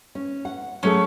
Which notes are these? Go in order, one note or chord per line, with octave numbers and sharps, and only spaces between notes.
C#4
F#5
F#3 A3 C#4 G#4